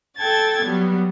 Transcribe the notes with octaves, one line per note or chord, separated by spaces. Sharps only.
A4 G5 A5 G#6 A6
F#3 G3 B3